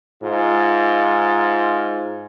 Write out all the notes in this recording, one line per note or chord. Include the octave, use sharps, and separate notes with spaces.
G#2 F4